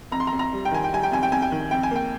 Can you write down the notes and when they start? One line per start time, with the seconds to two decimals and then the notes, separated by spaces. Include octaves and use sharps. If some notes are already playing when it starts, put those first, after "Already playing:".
0.12 F2 A#5
0.20 C6
0.27 A#5
0.32 F2
0.39 A#5
0.53 G3
0.65 G5
0.71 D#3 G#5
0.84 G5
0.93 G3 G#5
1.03 G5
1.11 F2 G#5
1.23 G5
1.32 F2 G#5
1.42 G5
1.52 D#3
1.71 F2 G5
1.83 G#5
1.91 A#3 G5